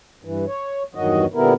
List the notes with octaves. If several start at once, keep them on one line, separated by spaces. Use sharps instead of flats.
G2 E3
C#5
E2 G2 D#3 F#3 F#4 D#5
A#2 D3 G3 B3 E4 A#4